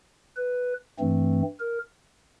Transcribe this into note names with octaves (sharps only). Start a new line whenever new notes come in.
B4
G2 E3 A3 C4
A#4